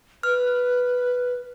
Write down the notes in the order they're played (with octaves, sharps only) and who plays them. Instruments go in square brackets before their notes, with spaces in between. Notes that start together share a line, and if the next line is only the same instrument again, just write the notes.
[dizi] B4 [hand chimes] F6